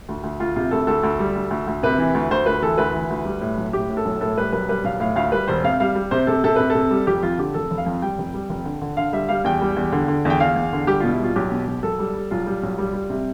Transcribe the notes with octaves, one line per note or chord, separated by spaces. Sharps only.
D2
D2
D2 F4
C3 F4
D2 A4
D2 A4
D2
G3
D2
D2
D2
C3 B4
E3
D2
D2 C5
D2 B4
E3 A4
D2 B4
E3
D2
G3
A2
B1
A2 G4
A2
A4
B1
A2 A4
G3 B4
B1 B4
G3 B4
B1 F5
A2 F5
D2 F5
G3 B4
E1 C5
C3 F5
G3 F5
G3
C3 C5
C3 A4
C3 A4
C3 B4
A4
C3
G3
F1 G4
F2 F4
D3 G4
F1 A4
F1
F5
F2
G3 G5
F1
G3
F1
D3
D3
D3 F5
G3 E5
G3 F5
E2 G5
G3
E2
D3
D3
E2 G5
E2 F5
E2
D3
G3 G4
B2 F4
E4
G3 F4
B1 G4
B2
B1
B1 A4
G3
G3
B1 F4
G3
B1
G3
G3
C3